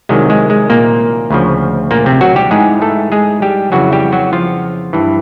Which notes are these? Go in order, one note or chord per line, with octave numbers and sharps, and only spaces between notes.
C2 C3 D#3 F#3 G#3
G#3
G#3
A#2 A#3
D2 C#3 F3
A#2 A#3
C3 C4
F#3 F#4
G3 G4
G#2 E3 G#3 G#4
A3 A4
G#3 G#4
G3 G4
F2 C#3 E3 F#3 F#4
G3 G4
F#3 F#4
F3 F4
G2 E3